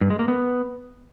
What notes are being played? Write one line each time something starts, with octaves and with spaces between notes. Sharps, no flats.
G2
G#3
A#3
B3